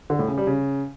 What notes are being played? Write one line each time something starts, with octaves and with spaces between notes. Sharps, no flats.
D3
A2
C#3
G3
C#3